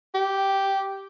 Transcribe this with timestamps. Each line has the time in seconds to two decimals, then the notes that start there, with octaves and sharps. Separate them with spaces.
0.14 G4